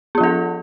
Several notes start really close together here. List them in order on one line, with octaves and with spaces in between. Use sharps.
B3 F4 F3 A4